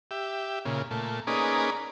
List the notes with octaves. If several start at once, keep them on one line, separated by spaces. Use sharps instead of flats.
G4 E5
A#2 C#3
A#2 A3
A#3 C#4 D#4 G#4 B4 D5